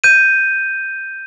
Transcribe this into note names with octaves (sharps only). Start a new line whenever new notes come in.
G6 D#7